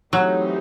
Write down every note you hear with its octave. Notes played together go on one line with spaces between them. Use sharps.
E3 F#3 A3 C4 D#4 G4